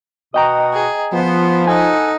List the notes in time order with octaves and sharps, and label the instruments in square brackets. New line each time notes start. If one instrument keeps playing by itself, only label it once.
[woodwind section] B2 F#4 D#6 [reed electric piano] D#5 G5 A#5
[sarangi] G#4
[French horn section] F3 [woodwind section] B3 [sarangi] C5
[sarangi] D#4 [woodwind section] A4 F#5 [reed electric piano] G#5